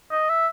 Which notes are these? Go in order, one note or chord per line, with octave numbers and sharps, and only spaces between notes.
D#5
E5